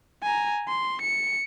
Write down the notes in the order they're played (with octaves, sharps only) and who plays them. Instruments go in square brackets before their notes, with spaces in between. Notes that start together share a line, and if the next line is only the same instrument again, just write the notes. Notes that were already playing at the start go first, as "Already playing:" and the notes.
[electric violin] G#5 A#5
C6
C#7